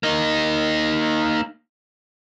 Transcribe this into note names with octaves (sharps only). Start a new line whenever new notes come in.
A#3 D#4